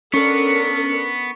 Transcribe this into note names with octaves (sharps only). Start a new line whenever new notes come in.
B3 C#4 D4 A4 A#4 C#6 C#7